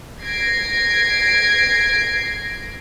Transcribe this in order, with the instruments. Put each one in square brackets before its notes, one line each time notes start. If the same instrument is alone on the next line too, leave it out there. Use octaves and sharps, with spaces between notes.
[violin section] G#6 A#6 C7 D7